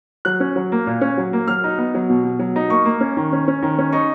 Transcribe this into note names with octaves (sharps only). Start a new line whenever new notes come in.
F#3 F#6
C#4
F#3
A#3
A#2
C#4
F#3
A#3
F#3 F6
D#4
B3
F#3
B2
B2
F#3
D#4
A#3 C#6
A#3
C#4
D#3
C#4
C#4
D#3
C#4
D#4 C#6